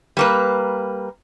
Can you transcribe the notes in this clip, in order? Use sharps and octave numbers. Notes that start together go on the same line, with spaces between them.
G3 A#3 B4